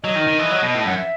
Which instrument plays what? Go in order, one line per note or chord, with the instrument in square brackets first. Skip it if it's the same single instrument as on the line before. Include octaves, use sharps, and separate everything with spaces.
[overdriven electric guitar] F#3 [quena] D#5
[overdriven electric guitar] D#3
D#3
E3
F#3
B2
A2
[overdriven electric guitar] F#2 [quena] F#5
[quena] E5